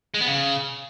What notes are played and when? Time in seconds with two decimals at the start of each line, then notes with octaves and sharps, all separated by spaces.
0.14 G#3
0.21 B3
0.27 C#3